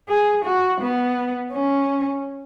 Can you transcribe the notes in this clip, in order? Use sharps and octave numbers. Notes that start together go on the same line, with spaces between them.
G#4
F#4
B3
C#4